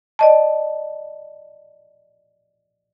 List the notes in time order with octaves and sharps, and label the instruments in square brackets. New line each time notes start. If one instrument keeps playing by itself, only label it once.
[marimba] D5 D#5 A5